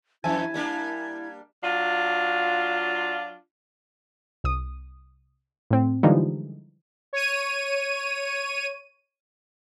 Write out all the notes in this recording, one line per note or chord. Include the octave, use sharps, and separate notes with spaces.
F2 E3 E4 E5 G#5 A5 G#6
G3 A#3 D4
F#3 D4 F4
C2 D#6
A2 C4
D3 E3 F3 G3 G#3 D#4
C#5 D#7